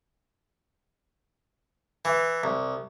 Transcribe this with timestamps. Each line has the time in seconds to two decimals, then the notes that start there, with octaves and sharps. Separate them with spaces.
2.05 E3
2.43 C2